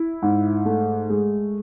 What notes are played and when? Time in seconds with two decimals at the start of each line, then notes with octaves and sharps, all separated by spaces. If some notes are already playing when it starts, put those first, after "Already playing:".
Already playing: E4
0.22 G#2
0.65 A3
1.10 G#3